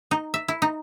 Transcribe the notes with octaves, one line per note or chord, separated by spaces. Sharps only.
D#4
E5
E4
D#4